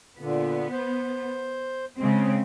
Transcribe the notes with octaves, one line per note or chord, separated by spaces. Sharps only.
A#2 D3 B3
C5
C#3 G#3 C4